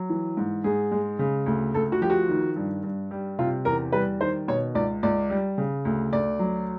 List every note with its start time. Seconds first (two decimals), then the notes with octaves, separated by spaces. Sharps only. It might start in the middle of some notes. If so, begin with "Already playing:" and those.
Already playing: F#3
0.10 E3
0.37 G#2
0.64 G#2 G#4
0.91 G#3
1.19 C#3
1.46 D2
1.74 D2 A4
1.92 F#4
2.01 F3 G4
2.10 F#4
2.29 D#3
2.56 G2
2.83 G2
3.11 G3
3.39 C3 F4
3.65 E2 A#4
3.92 G3 B4
4.20 D#3 C5
4.48 B2 C#5
4.75 C#2 D5
5.03 C#2 D5
5.30 G3
5.58 C#3
5.85 D2
6.13 D2 D5
6.39 F#3